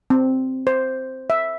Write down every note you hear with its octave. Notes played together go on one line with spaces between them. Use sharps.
C4
C5
E5